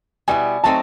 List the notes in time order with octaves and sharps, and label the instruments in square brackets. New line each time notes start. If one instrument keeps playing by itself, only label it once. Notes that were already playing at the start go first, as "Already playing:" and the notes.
[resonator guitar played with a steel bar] B2 G3 B3 E4 [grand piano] G#5
[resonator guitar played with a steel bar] F#3 A3 C4 D#4 [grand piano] A5